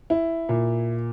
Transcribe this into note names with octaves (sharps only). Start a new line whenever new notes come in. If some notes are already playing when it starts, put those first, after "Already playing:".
E4
A#2